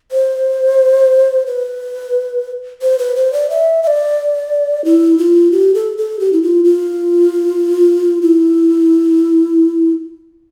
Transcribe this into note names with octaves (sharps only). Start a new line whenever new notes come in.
C5
B4
C5
B4
C5
D5
E5
E5
D5
E4
F4
G4
A4
A4
G4
E4
F4
F4
E4